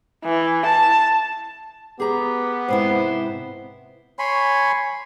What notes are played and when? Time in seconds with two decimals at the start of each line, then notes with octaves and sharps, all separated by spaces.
0.25 E3
0.66 A5
2.00 B3 G4 G#4 A#5
2.68 G#2 C3 E4 C5
4.19 C#5 G#5 B5 C6